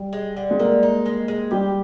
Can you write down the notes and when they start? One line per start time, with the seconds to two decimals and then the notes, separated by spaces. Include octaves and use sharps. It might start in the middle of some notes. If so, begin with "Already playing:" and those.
Already playing: G3
0.13 G#3
0.36 D3
0.51 G#3
0.59 D3 A#3
0.83 D#4
1.06 G#3
1.28 G#3
1.51 G3 G4